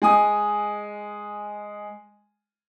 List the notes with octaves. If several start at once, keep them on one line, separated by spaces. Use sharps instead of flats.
G#3 G#5 D#6